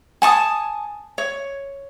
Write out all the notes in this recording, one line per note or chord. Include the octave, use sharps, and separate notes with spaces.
G#5 A5 C#6 D#6
C#5